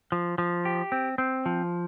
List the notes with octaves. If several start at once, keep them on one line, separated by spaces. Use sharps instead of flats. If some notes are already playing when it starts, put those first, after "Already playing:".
F3
F3
G4
C4
C4
F3